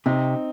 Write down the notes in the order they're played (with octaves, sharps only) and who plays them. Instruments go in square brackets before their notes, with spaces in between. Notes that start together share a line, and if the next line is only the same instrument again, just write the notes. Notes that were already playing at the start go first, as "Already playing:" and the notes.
[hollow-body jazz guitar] C3 [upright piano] C4 D#4